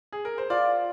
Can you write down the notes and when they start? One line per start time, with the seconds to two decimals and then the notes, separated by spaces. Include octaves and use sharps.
0.13 G#4
0.25 A#4
0.38 C5
0.50 F4 D5